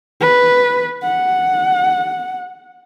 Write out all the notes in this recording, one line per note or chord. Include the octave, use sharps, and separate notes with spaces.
B4
F#5